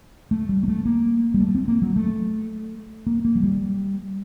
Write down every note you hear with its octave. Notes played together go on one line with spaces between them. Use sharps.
A3
G3
A#3
A3
A#3
G3
A3
C4
A#3
F#3
A3
A#3
A#3
F#3
G3